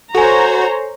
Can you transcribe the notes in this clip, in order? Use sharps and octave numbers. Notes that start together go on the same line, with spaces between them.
F#4 A4 C5 C#5 G#5 A#5